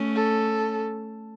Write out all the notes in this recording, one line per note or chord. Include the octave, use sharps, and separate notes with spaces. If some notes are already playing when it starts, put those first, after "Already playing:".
Already playing: A3 C#4
A4